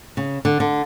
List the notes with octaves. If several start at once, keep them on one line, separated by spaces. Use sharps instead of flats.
C#3
D3
D3